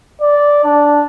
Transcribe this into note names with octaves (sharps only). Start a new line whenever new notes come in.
D5
D4